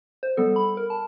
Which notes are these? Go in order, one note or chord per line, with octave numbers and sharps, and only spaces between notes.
C5
G3 B3 A4
B5
A#4
A5